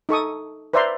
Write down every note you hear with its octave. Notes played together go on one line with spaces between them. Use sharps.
D#4 A4 C#6 D#6
B4 C5 D5 E5 A#5 C6